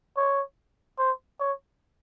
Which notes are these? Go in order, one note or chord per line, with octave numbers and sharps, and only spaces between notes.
C#5
C5
C#5